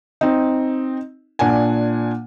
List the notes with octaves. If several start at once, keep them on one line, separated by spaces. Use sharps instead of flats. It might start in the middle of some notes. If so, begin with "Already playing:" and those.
C4 D#4
A#2 D4 F#5 G#5